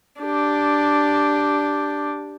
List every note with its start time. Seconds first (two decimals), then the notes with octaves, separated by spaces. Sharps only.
0.21 D4 G4